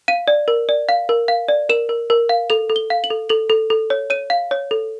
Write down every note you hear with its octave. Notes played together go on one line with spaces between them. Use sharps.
F5 D#7
D5
A#4
D5
F5
A#4
F5
D5
A#4 E7
A#4
A#4
F5
A4 F7
A4
G7
F5
F#7
A4
A4 F#7
A4
A4
C#5
C#5 D#7
F5
C#5
A4